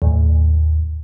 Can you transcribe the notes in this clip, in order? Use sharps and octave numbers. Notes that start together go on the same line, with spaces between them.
D#2 A2